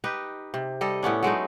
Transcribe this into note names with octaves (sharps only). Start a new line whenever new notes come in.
D#4 G4 B4
C3
G3 A4 D#5
A2 B3 C#4 D4
F#3 G#3 A3 D#4